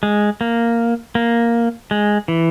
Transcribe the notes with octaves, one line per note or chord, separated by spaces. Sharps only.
G#3
A#3
A#3
G#3
E3